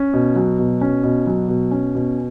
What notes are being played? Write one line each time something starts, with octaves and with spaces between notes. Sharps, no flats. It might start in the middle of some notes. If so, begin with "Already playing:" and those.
Already playing: C#4
B2
F#3
B2
C#4
B2
F#3
B2
C#4
B2